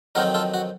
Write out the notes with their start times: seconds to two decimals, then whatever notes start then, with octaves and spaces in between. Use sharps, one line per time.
0.15 F2 D#3 F#3 C4 D#4 F#4 A#4
0.34 F4 A4
0.54 F#4